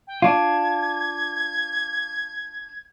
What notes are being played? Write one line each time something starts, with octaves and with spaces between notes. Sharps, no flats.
G5
D4 F4 G#6